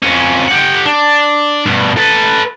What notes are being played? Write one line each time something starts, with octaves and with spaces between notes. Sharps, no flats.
F2 C#4
G4 F#5
D4
G2 B2
A4 B4